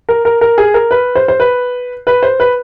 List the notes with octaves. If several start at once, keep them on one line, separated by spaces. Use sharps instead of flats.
A#4
A#4
A#4
G#4
A#4
B4
C5
C5
B4
B4
C5
B4